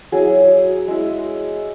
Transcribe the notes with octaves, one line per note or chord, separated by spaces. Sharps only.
F#3 E4 G#4
G#3 E4